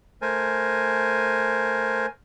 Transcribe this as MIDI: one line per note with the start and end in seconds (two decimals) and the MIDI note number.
0.22 2.06 57
0.22 2.06 70
0.22 2.06 72
0.22 2.06 80